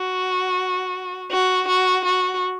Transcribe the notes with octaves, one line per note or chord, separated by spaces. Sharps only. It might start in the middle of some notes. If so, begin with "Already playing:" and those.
Already playing: F#4
F#4
F#4
F#4